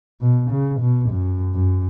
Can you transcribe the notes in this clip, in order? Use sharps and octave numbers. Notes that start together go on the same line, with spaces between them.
B2
C#3
B2
F#2
F#2